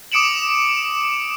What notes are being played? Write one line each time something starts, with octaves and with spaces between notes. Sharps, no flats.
D6 D#6 C#7 D7 E7 F#7